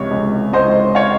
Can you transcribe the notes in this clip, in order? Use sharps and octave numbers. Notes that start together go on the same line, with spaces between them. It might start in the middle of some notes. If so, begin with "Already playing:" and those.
Already playing: C#2 C3 C#5
C#2
C#2 C5 D#5
C#5 F5